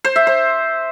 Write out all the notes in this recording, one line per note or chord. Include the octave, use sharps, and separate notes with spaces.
C5
E5
C5